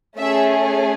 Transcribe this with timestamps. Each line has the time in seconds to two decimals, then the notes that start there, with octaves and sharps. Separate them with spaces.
0.17 A3 C#4 G#4 E5